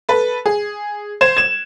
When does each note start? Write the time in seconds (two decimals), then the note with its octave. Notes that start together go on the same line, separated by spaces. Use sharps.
0.09 A4 B4
0.46 G#4
1.21 C5 G#6 E7
1.37 G#6 E7